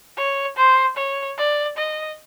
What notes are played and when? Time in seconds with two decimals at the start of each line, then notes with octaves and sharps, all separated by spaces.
0.17 C#5
0.57 C5
0.97 C#5
1.38 D5
1.77 D#5